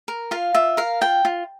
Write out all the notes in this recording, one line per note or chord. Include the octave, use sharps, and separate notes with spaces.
A#4
F4 F5
F4 E5
A#4 F5
F4 G5
F4